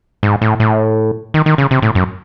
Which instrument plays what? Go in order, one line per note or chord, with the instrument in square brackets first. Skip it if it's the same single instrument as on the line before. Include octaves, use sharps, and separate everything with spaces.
[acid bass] G#2
A2
A2
D#3
D#3
C#3
C3
A2
F#2